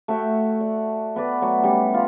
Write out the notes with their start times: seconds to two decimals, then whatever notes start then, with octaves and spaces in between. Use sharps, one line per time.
0.08 A3 F#4 E5 G5
0.61 D5
1.16 B3 B4 D5
1.41 F#3 A3 F#4
1.63 G3 C#4
1.94 F4 A#5